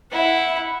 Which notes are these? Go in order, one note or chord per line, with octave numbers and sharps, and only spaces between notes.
E4 F#5